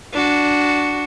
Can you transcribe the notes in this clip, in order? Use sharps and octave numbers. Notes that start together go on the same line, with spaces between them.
D4 F#4